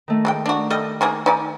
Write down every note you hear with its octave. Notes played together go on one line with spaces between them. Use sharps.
D#3 A3 D#4
G#3 G#4 G5
D4 F#4 A#5
G3 A3 D#5
D#3 A#3 G#4
D#4 D5 G#5